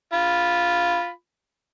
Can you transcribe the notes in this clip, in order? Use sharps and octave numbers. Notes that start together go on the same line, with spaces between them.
F4 B5